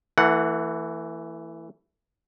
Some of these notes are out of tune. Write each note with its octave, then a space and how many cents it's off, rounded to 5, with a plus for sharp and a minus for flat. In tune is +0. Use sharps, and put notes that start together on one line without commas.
E3 +5 A3 +35 F#5 +0